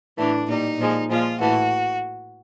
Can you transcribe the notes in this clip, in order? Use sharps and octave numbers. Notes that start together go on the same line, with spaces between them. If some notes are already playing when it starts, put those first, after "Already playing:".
A2 E3 A3 D4
A#2 G3 D#4
A#2 F3 G#3
A#2 F3 G#3 F4
A2 E3 A3 F#4